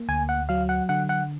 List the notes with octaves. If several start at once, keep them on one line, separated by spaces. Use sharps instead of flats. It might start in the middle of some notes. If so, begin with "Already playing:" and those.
Already playing: A#3
D2 G#5
F#5
F#3 F5
F#5
D3 F#5
F#5